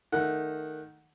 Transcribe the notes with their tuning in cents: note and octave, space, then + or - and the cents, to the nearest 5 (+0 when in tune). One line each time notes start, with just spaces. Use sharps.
D#3 +0 A3 +0 F#5 +0